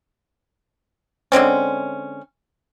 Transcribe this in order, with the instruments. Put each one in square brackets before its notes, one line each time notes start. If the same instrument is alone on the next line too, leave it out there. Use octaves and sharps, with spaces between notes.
[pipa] D3 G#3 C4 C#4